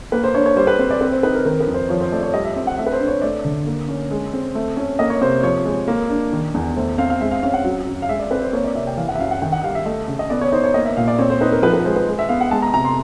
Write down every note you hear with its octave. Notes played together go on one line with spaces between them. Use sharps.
A#3 B4
C5
D4 C#5
C#5
G3 C5
B4
C4 C5
D5
C4 B4
C5
D#4 B4
A#4
D#3 A#4
B4
F2
C5
F3 C#5
C5
A3 D5
C#5
G3 D#5
E5
C4 E5
F#5
A3 E5
B4
C5
D4
C#5
A3 D5
D3
A#3
C#4
G#3
C4
A3
C#4
A#3 D#5
C#5
C3 C5
F3 C#5
G#3
A#3
D4
D#3
E2
A3 C5
C4 F5
F5
G#3 E5
F5
C#4 F5
F#5
F#3
F#2
F5
G#3 E5
D5
C4 B4
C5
A#3 C#5
D5
C3 E5
G5
E3 F5
F#5
E5
F#2 F5
F#5
D#3 G5
F#5
G3 F5
E5
A3 D#5
C#3
D#5
B3 D5
C#5
D#4 C5
C#5
A#3 D#5
E5
A#2 F5
D5
C4 C#5
C5
D#4 B4
A#4
F3 B4
B4
G#3 C5
B4
G#3
E5
B3 F5
F#5
G#3 A5
A#5
C3 A#5
C6